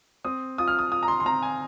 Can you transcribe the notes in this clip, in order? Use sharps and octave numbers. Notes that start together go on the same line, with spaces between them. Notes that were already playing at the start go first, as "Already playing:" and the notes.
C4 D#6
F4 D#6
F6
D#6
F4 D#6
A#5
C6
C6
C4 A#5
G#5